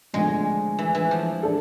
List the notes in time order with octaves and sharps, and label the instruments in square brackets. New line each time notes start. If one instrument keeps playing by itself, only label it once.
[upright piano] F2 D3 A3 [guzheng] G#3
[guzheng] E3
E3
F3
[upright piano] D4 A4